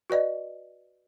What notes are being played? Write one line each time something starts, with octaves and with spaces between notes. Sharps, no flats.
F#4 B4 D5 D#5